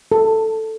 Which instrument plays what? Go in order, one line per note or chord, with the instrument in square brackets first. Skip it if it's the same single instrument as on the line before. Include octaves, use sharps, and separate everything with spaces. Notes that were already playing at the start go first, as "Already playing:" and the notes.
[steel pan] A4